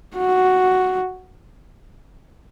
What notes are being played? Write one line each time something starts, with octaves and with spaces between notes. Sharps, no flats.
F#4